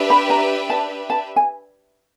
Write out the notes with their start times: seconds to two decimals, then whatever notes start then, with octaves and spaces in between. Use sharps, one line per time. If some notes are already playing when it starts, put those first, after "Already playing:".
Already playing: D4 G4 B4 E5
0.10 B5
0.30 A#5
0.70 A5
1.10 A5
1.36 G#5